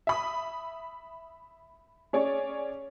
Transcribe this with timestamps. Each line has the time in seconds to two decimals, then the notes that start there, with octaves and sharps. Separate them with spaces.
0.07 E5 B5 D#6
2.13 C#4 G#4 C#5 D5